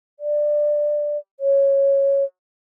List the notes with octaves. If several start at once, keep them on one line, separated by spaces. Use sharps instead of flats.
D5
C#5